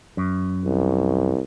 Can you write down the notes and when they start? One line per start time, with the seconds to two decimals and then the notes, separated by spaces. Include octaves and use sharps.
0.17 F#2
0.65 C2